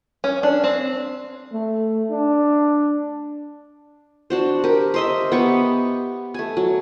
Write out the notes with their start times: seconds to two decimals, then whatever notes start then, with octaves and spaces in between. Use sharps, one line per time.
0.24 C#4
0.43 D4
0.64 C4
1.52 A3
2.10 D4
4.30 D4 F#4 C5
4.64 G4 A#4
4.94 C5 D#5 E5
5.32 B3 G4 C#6
6.34 A3 G#5
6.57 F#3